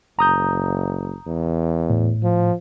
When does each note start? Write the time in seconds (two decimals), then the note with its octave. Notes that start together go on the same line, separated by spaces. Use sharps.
0.19 F#1 A#5 D#6 G6
1.26 E2
1.90 A2
2.23 F3